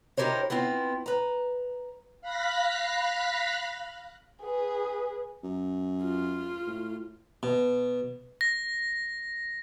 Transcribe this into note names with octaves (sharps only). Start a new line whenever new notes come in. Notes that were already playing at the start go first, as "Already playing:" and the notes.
D#4 E4 G4 A#4 C5 C#5
B3 C4 E4 F4
B4 A#5
F5 B5 F#6 A#6 B6
G#4 B4
F#2
F4
A2
B2
A#6